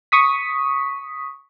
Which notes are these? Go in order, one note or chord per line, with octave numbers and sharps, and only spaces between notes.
C#6 D#6 B6